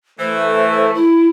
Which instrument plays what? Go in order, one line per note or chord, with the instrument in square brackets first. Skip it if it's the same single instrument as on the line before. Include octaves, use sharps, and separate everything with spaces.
[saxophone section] E3 [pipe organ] A3 [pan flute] C5
[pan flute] E4